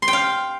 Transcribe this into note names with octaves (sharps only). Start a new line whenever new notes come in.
C6
G5
F5